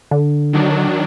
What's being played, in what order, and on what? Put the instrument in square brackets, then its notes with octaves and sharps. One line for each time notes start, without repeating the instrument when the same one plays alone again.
[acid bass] D3
[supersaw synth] D#3 F#3 D4